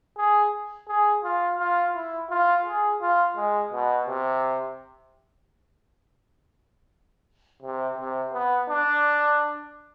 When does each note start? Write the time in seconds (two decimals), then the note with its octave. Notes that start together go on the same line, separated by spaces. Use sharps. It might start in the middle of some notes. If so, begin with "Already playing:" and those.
0.18 G#4
0.88 G#4
1.24 F4
1.59 F4
1.95 E4
2.30 F4
2.66 G#4
3.02 F4
3.37 G#3
3.73 B2
4.07 C3
7.63 C3
7.98 C3
8.33 B3
8.69 D4